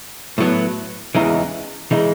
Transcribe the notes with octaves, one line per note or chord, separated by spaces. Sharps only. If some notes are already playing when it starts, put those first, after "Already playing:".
A2 F#3 B3
E2 C#3 E3 G#3 D#4
C#3 E3 G#3 D#4